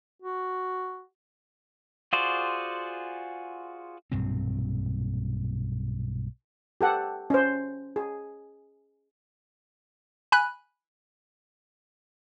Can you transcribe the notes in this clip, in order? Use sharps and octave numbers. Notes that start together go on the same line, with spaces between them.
F#4
F4 F#4 G#4 C5 D5
B1 G2 A#2 C4
G4 A4 F#5
C#4 C5
G#4
G#5 B5 F#6